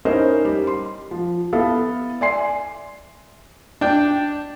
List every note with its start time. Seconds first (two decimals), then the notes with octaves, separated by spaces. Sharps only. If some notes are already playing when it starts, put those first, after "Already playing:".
0.05 C#4 D#4 E4 A#4 C5 D#5
0.45 G3
0.67 C6
1.11 F3
1.53 B3 E4 A4 F5
2.21 D5 E5 G#5 C6 C7
3.81 D4 G5